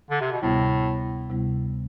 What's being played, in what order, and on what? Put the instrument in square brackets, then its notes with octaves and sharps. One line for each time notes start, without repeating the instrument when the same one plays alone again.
[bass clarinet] D3
C3
B2
[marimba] D2 C3 G3 B3 E4 [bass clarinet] A2
[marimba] D2 C3 G3 B3 E4